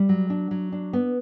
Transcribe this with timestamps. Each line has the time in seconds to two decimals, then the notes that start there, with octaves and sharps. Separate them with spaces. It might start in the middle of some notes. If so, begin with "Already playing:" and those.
Already playing: G3
0.09 F#3
0.30 D4
0.51 F#3
0.72 D4
0.93 B3